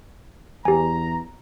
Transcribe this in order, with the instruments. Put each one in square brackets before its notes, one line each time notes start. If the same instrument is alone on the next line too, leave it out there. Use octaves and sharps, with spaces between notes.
[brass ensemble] E2 A#5 [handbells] G4 G#5